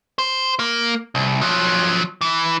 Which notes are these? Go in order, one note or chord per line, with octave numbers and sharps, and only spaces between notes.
C5
A#3
C2
F3 F#3
E3